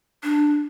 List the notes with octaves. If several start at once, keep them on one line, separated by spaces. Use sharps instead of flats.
D4